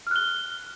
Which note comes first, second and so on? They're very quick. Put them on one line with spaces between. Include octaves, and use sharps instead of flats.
F6 F#6 G7